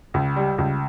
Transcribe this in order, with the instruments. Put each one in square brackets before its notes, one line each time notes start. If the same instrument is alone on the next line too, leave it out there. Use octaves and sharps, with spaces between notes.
[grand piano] C#2
G3
C#2